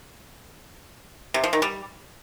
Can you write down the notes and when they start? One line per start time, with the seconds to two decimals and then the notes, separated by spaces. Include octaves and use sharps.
1.34 C3
1.44 F3
1.53 D#3
1.62 G3